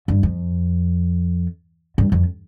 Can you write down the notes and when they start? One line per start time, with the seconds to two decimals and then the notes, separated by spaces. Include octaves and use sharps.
0.08 G2
0.23 F2
1.98 G2
2.12 F2